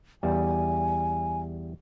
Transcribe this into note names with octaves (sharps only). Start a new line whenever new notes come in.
E2 G3 G#5